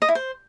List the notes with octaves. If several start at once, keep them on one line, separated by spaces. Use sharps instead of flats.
D#5
E4
C5